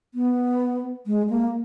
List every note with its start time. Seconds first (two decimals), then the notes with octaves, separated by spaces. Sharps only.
0.14 B3
1.07 G#3
1.30 A#3